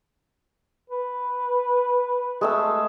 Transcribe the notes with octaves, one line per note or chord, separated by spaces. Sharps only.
B4
G#3 A3 E6